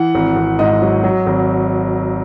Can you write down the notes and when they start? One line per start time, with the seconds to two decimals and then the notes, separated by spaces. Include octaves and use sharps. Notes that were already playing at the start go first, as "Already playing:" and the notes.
Already playing: E3 F#5
0.15 G#1
0.36 G#1
0.59 G#2 D#5
0.82 F#3
1.04 F#3
1.27 G#1